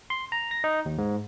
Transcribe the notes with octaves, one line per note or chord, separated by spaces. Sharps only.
C6
A#5
A#6
D#4
D#2
G#2